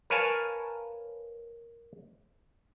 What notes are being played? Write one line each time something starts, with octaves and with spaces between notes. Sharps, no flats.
A#4 B4 C#5 F5 G#5 A5